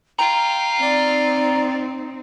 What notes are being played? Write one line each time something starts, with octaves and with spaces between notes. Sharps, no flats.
F4 G5 A#5
C4 D#4 D5